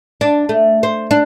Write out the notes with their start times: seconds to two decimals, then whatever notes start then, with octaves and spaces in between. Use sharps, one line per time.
0.21 D4
0.49 A3
0.83 C5
1.11 D4